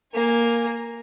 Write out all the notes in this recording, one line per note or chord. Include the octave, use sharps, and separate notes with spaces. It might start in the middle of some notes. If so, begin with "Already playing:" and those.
A#3 G#5